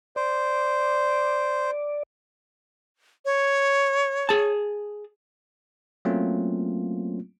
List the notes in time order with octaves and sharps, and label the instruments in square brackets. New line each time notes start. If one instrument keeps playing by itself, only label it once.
[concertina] C5 [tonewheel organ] D5
[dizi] C#5
[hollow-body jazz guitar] G#4 A5
[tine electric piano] F#3 A3 A#3 C4 C#4 F4